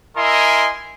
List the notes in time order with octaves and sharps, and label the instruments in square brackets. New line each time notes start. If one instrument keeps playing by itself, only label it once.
[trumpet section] E4 A#4 D#5 E5 G#5 C6